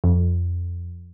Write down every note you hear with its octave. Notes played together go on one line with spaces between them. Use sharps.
F2